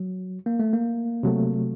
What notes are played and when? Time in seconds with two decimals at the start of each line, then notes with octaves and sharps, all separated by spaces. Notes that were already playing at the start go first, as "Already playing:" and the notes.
Already playing: F#3
0.46 A#3
0.59 A3
0.73 A#3
1.23 C3 F#3 A3